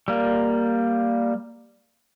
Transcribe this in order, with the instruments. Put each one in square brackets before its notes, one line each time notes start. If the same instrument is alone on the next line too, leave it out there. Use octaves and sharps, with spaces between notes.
[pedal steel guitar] G3 A#3